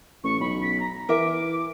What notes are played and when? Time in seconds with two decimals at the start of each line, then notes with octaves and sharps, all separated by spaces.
0.23 A1 C#6
0.40 B1 B5
0.61 B6
0.79 A#5
1.09 E3 A#4 E5 D6